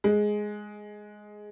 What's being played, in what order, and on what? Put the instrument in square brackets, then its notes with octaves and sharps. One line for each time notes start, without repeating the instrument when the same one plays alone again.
[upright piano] G#3